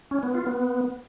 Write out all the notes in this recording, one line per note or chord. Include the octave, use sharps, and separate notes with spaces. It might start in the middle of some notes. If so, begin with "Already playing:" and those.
C#4
B3
F4
B3